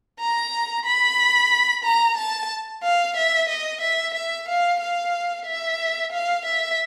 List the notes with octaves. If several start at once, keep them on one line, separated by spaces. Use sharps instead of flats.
A#5
B5
A#5
A5
F5
E5
D#5
E5
E5
F5
F5
E5
F5
E5